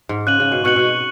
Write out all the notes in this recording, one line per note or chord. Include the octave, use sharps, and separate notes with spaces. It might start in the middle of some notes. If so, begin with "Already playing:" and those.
G#2
C#3 F#6 D#7 F#7
C#3
B2
B2 C#6 F#6 C#7 F#7
B2